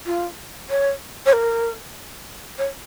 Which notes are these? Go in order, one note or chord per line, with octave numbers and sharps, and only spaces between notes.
F4
C#5
C#5
A#4
C#5